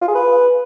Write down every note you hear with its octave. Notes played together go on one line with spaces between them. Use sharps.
F4
G#4
B4